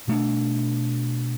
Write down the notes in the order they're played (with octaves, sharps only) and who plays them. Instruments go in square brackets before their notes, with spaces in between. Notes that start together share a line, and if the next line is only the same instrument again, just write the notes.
[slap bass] B2 A3 D4